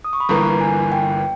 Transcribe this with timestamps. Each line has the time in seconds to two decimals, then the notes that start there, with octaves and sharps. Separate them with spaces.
0.05 D#6
0.13 C#6
0.20 B5
0.29 G1 G2 E3 A#3 A#5
0.61 G#5
0.92 G5